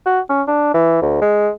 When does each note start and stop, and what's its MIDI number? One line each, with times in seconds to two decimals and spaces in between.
0.06 0.20 66
0.30 0.42 61
0.48 0.72 62
0.74 0.99 52
1.02 1.21 38
1.22 1.51 56